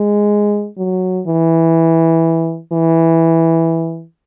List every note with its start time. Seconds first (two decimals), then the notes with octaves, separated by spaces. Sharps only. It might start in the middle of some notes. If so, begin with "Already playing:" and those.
Already playing: G#3
0.78 F#3
1.27 E3
2.72 E3